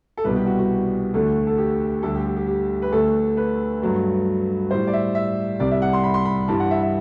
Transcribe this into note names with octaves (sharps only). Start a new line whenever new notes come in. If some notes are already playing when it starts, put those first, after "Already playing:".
A4
C2 B2 G3 B4
G4
F#4
F#4
D2 D3 A3
A4
G4
D2 D3 G3 A4
G4
G4
G4
G4
B4
D2 D3 A3 A4
B4
G2 F#3 A3
A2 G3 C5
D5
E5
E5
C2 C3 G3 D5
E5
F#5
C6
B5
C6
B5
G2 E3 G3 A5
F#5
E5
E5